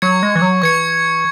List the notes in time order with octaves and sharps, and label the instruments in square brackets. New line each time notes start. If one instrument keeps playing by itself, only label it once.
[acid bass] F#3 [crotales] C#6 G#6 C#7
[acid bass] G#3
E3
F#3
[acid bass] E3 [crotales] C#6 G#6 C#7